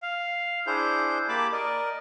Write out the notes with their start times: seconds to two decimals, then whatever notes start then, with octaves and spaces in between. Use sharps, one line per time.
0.02 F5
0.67 D4 E4 G#4 C5 G6
1.28 A#3 G4 A5 B5 D6
1.52 A#4 D5 D#5